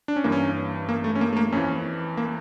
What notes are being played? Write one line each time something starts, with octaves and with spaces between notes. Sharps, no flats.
D4
C#4
G2 E3 A#3
C#4
A#3
A3
C#4
A#3
A3
A#3
F2 E3 C#4
A#3